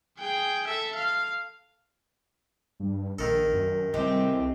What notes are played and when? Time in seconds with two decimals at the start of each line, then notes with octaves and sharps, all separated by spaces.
0.19 G#4 G5
0.68 A4 E5
0.96 F5
2.80 G2
3.19 A#1 D#3 A4
3.53 F#2
3.94 C2 G#3 A3 C4 G4